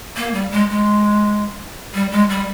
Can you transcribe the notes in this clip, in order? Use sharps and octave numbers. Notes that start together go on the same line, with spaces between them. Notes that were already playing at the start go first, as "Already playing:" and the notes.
A#3
G3
G#3
G#3
G3
G#3
G3